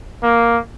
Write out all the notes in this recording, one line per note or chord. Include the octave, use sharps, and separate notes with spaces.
A#3